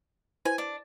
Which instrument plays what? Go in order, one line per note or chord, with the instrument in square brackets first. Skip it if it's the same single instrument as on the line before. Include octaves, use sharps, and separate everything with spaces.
[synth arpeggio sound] E4 B4 C5 [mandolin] G#5
[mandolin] D4